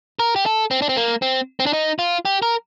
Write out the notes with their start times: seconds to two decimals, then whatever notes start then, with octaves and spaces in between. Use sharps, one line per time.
0.19 A#4
0.36 G4
0.46 A4
0.71 C4
0.82 D4
0.89 C4
0.97 A#3
1.22 C4
1.60 C4
1.66 D4
1.73 D#4
1.99 F4
2.25 G4
2.42 A#4